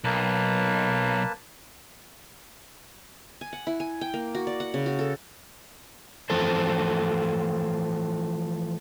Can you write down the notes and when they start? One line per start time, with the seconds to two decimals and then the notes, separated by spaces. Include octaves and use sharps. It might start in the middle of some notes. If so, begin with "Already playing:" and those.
0.04 B1 A#3 B4 A5
3.41 G#5
3.53 F#5
3.67 E4
3.80 G#5
4.01 G5
4.14 A#3
4.35 F#4
4.47 D5
4.60 F#5
4.74 C#3
4.86 F#4
4.99 A4
6.30 E3 F3 A3 A4 C5